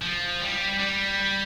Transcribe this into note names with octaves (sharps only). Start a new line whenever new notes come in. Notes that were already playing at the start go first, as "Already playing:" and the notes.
F3
G3
G3